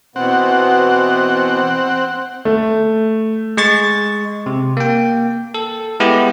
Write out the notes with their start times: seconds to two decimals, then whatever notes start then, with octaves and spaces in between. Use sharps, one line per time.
0.16 B2 E3 B3 C4 F#5
2.45 A3
3.57 G#3 C#6 A6
4.46 C3
4.77 A#3 G5
5.54 A4
6.00 G#3 B3 E4 G4